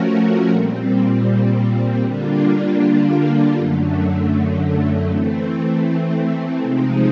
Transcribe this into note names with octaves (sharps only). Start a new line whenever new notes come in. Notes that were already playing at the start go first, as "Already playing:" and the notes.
Already playing: F3 A3 C#4 F#4 A#4
A#2 G3 C4
D3 G3 A#3 D4 F4
F#2 D3 F#3 A3
E3 A3 C4
C3 F3 G#3 C4 D#4